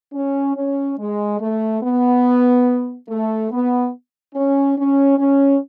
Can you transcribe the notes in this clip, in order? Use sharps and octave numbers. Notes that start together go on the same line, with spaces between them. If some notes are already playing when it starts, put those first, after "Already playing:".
C#4
C#4
G#3
A3
B3
A3
B3
C#4
C#4
C#4